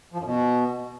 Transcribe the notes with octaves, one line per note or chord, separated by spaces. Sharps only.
F3
F#2
B2